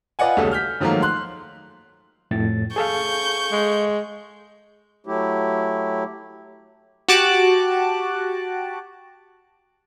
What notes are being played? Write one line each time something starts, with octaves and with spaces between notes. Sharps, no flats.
F4 B4 D5 D#5 F#5 G#5
D#1 B1 C#3 A3 A4
F6 G6 B6
G#2 D#3 F3 F#3 A3 A#3
C6 F#6
F2 A2 A6
G#4 A4 F5 C#6 G6
G#3
F#3 A3 E4 G4
F#4 G4 A5 D6 F#6